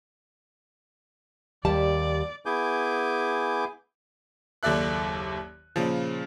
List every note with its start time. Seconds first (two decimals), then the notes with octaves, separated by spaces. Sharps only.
1.65 D#2 G3 D5 A5
2.46 B3 E4 G#4 G#5 D6 G6
4.63 F#1 D#2 A4 D5 E5 F#6
5.76 A#2 C#3 F3